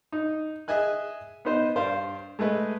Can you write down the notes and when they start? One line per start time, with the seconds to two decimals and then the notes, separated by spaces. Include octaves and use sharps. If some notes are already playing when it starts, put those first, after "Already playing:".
0.12 D#4
0.68 G#4 D#5 E5 G#5 F#6
1.45 B3 D#4 C5 D#5
1.76 G2 C5 D5 F5
2.39 G#3 A3 B4 D#5